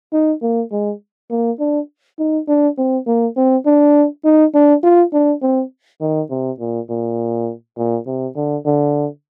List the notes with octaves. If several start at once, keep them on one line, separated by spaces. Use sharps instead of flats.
D#4
A#3
G#3
A#3
D4
D#4
D4
C4
A#3
C4
D4
D#4
D4
F4
D4
C4
D#3
C3
A#2
A#2
A#2
C3
D3
D3